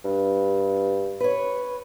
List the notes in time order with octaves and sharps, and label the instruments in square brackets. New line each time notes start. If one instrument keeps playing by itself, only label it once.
[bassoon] G2
[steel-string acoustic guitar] B4 C#5